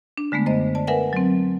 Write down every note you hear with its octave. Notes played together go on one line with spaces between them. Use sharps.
D4
D3 G#3 A3 B3
F#2 C5 D#5
D5 A5
A#4 B4 E5 F#5 G#5
F#3 C4